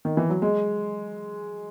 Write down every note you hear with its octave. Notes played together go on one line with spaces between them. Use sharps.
D#3
E3
F#3
G#3